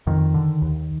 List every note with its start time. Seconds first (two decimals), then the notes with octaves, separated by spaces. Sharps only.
0.07 F2 D#3
0.34 D3
0.62 D#2